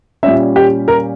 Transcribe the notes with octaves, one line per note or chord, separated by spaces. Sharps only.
A#2 G3 C#4 E5
G4
A#4